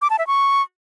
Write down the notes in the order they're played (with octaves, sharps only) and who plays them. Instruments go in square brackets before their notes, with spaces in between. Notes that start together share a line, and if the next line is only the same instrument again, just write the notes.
[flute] D6
A5
E5
C#6